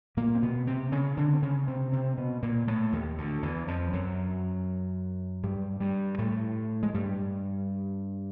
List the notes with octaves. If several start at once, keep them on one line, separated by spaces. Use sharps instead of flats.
A#2 A#3
C4
B2 B3
C3 C4
C#3 C#4
D3 D4
C4
C#3 C#4
C3 C4
C3 C4
B2 B3
A#2 A#3
A2 A3
D#2 D#3
D2 D3
E2 E3
F2 F3
F#2 F#3
G2 G3
G2 G3
A2 A3
G#3
G2 G3